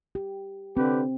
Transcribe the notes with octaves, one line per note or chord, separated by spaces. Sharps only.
G4
D3 C4 G4 B4